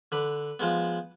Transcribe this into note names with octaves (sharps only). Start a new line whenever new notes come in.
D3 B4
F3 G#3 B3